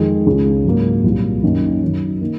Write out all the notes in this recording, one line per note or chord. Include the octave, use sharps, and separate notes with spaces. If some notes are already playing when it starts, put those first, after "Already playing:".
Already playing: F2 D#3 G#3
C#2 C#3 G#3
G#2 F#3 A#3
C2 A#2 F#3 A#3
F#2 D#3 A#3 C#4
F#2 D#3 F#3
D#3 A#3